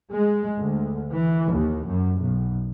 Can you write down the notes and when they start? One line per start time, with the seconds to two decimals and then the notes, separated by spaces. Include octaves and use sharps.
0.10 G#3
0.59 D2
1.11 E3
1.51 D#2
1.86 F#2
2.21 B1